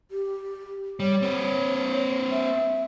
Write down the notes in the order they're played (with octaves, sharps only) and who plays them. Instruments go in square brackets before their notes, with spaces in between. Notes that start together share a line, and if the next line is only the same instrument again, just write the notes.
[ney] G4
[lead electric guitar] G3 [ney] C#5
[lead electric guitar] C4 B4
[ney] E5